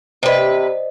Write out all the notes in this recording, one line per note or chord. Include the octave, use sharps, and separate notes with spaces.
C3 B4 C5 D5 D#5